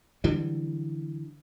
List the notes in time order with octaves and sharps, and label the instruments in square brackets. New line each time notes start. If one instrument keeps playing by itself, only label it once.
[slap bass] D3 E3 F#3 G3